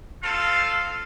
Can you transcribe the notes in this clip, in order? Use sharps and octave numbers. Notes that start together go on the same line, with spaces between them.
C4 F4 A4 F5